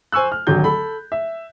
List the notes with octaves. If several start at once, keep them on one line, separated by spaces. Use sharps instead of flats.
C5 G#5 C#6 E6 F#6
F6
G#1 D#2 D3 F#3 G6
A4 B5
E5